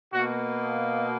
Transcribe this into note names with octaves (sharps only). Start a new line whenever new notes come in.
B2 A#3 F#4